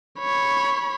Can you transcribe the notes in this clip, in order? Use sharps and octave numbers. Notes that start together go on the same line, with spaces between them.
C#5 B5